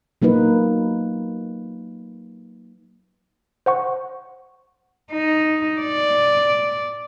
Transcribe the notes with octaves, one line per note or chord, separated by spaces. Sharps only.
F#3 A#3 D#4 B4
C5 F#5 C#6
D#4
D5